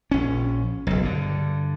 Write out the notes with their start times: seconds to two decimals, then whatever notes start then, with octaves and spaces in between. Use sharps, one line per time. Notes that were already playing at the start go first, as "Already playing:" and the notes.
0.11 A#1 C#4
0.87 F#1 B1
1.03 G2 D3